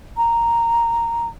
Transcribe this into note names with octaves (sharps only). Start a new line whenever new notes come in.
A#5